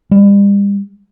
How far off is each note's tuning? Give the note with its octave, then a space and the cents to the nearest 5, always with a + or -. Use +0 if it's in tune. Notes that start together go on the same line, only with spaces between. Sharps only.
G3 +40